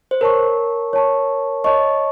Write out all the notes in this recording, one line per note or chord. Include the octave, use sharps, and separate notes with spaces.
C5
A#4 C#5 A5 C#6
C#5 A5 C#6
C#5 D#5 A5 C#6